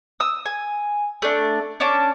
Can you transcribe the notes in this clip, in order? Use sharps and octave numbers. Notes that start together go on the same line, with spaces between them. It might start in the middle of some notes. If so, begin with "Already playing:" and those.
D#6 E6
G#5
A3 D4
C#4 D4 A5 D6